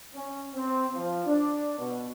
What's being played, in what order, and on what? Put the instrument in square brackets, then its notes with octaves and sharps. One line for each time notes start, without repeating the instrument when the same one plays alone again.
[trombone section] C#4
C4
F3
D4
B2